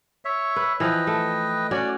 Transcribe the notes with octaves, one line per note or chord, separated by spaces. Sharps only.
C#5 E5
B4
E3 F3 B4 D#5 G5
A3
C#4 F#4 C#5 D5